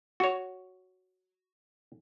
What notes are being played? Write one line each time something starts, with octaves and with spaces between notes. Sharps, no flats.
F#4 C#5